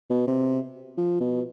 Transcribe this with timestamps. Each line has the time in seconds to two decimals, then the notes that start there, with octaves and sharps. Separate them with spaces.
0.10 B2
0.27 C3
0.98 F3
1.21 B2